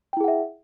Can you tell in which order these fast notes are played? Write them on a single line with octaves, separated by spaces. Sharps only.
G5 E4 G#4 F#5 E5